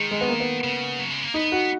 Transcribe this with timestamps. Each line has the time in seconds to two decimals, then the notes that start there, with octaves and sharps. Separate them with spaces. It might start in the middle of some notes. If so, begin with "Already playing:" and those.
Already playing: D#3 G#3
0.11 G#3
0.21 B3
0.28 A#3
0.40 B3
0.64 C#3
0.99 F#3
1.11 G#3
1.23 A#3
1.34 B3 D#4
1.52 F#4